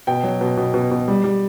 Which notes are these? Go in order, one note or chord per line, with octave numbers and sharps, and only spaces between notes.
B2 G5
F#3
B2
B2
B2
B2
G3
G3